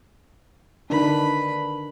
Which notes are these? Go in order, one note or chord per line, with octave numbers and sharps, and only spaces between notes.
D3 D#3 D4 B4 B5